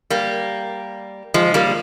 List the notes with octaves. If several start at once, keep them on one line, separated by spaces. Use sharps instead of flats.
G3 A#3
F3 G#3
G3 A#3